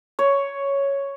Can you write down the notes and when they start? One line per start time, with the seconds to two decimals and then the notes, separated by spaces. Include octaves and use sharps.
0.19 C#5